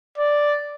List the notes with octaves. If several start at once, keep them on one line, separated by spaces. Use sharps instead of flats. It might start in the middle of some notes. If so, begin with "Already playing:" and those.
D5